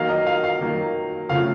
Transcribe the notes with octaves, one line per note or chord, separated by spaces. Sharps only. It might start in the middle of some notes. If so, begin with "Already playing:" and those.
Already playing: D#3 F#3 A#3 D#4 F5
D#5
F5
F5
D#3 F#3 A#3 D#4
F2 C#3 F3 A3 F5